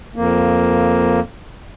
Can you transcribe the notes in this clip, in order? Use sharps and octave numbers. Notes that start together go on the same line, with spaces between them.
F2 A#3